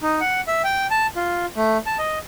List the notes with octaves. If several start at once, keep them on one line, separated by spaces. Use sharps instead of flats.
D#4
F#5
E5
G5
A5
F4
A3
A5
D#5